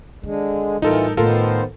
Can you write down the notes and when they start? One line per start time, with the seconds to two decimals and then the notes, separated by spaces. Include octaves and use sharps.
0.23 D3 D#3 G#3
0.82 A2 E3 G3 D#4 F4 A4 A#4
1.17 A2 D#3 B3 F4 A4 A#4 C5